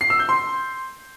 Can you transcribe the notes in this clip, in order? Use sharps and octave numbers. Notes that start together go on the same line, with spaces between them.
C7
E6
G6
C6